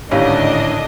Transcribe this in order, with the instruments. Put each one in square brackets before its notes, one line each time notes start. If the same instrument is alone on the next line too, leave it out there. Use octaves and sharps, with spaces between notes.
[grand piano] G#1 A2 [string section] D3 D4 D#5 [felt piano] C#4 G4 F5